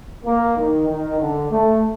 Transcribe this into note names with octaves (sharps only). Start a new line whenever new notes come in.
A#3
D#3
D#3
D3
A3